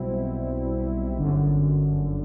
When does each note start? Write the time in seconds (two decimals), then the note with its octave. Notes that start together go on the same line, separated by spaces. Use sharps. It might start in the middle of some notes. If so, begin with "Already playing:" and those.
Already playing: B1 B2 G3 C4 E4
1.18 G1 F#2 D3